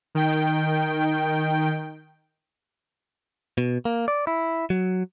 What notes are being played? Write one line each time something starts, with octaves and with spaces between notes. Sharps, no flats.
D#3 G5
B2
A#3
D5
E4
F#3